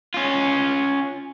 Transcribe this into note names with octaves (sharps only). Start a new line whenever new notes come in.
C#4 F4